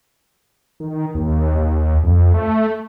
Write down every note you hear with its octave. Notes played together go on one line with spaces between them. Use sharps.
D#3
D#2
D#2
F2
A3